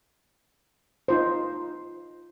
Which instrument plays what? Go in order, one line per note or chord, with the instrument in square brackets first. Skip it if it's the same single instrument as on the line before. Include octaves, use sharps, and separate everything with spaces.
[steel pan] D#4 F4 C5